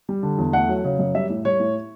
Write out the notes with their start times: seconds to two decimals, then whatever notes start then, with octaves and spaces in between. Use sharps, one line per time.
0.09 G3
0.23 D3
0.38 E2
0.53 A3 F#5
0.69 F#3
0.85 C#3
0.99 F#2
1.15 G3 E5
1.30 A2
1.45 G3 C#5
1.60 A2